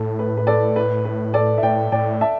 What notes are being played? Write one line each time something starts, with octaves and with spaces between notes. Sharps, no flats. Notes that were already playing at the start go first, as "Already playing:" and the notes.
Already playing: A2 A4
B4
B4
A4 D5
B4
B4
A4 D5
E5
A2 D5 G5
A2 D5 G5
E5 A5